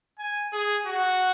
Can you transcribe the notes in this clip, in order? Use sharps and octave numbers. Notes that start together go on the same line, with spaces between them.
G#5
G#4
F#4